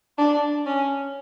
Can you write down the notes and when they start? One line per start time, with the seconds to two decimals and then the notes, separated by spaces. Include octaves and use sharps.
0.18 D4
0.66 C#4